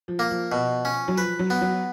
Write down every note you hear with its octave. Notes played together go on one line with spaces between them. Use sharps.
F3
A#3
F3
B2
C#4
F#3
F3 B4
F#3
B3
F#3